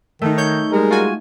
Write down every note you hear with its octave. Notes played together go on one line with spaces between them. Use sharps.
D#3 A3 D#4
C#5 G6
G3 G#3 A#4
F4 F#4 G#5